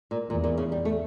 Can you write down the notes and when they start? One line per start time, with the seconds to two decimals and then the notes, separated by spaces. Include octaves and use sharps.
0.11 A#2
0.30 E2 A#2
0.44 A#2
0.58 C#3
0.72 G3
0.85 A3